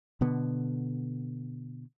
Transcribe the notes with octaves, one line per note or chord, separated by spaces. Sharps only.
B2 D3 B3